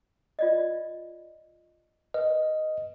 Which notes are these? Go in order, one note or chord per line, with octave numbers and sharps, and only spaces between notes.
F4 D5 D#5
B4 D#5